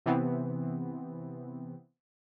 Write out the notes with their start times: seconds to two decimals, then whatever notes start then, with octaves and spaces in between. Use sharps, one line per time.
0.06 C3 E3 B3 C4